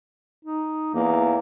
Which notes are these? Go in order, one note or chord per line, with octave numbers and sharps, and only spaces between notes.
D#4
E2 A#3